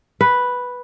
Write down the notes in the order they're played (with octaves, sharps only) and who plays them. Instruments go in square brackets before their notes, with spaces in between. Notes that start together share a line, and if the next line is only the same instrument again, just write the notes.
[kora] B4